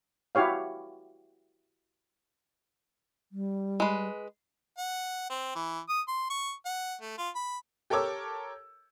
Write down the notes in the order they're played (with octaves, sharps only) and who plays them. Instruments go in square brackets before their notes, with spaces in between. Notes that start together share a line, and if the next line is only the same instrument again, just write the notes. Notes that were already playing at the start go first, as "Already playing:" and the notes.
[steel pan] E4 F#4 G4 C#5 F5
[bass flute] G3
[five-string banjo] G#3 B4
[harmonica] F#5
C4
E3
D#6
C6
C#6
F#5
A3
F4
B5
[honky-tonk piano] G4 A4 A#4 C#5 D6 E6